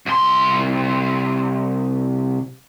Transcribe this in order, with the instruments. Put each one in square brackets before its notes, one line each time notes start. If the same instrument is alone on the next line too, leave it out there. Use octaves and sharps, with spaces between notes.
[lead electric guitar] C2 C6